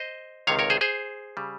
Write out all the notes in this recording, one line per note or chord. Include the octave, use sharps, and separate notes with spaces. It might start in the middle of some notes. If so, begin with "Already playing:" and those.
Already playing: C5 D#5
C#2 C3 D#3 C#5 F5
A#4 C#5
G#4 C5
G#4 C5
C#3 G3